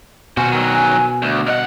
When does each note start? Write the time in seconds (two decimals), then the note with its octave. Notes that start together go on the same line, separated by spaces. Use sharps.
0.37 B2 F#4 C5 G#5
0.52 D#3 F#3
1.22 D2
1.47 G2 D#5 F#5